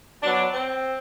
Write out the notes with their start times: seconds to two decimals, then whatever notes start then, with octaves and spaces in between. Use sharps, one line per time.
0.22 B2 F#3 D4
0.53 C4